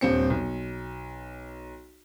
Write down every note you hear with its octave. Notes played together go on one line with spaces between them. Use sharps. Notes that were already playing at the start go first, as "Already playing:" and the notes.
D#1 G2 C4 C#7
B1